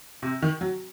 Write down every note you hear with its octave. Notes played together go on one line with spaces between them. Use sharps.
C3
D#3
F#3